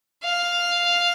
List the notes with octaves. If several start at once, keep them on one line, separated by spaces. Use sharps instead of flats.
F5